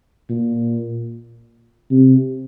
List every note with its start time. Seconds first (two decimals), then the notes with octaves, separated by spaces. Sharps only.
0.29 A#2
1.91 C3